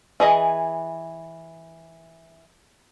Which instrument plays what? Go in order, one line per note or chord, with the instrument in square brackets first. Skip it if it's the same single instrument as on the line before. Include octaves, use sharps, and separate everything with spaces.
[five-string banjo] E3 G#4 D#5